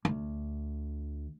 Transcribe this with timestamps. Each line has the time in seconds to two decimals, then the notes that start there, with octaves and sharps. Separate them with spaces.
0.05 D2